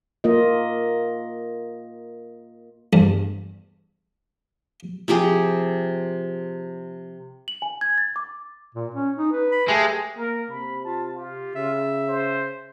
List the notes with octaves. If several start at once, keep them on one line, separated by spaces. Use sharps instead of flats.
A#3 F4 A#4 D#5
E2 G2
C3 F3 G4 G#4
F#7
G#5
G#6
A6
D6
A#2
C#4
D#4
B4
B5
G#3 A3 G4
A#3 A#4
C3 B5
F4 A5
F4 G4
C#3 E5
C5